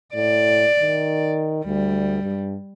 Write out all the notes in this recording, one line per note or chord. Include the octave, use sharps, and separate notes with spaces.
A2 D5
D#3
D2 G3
G2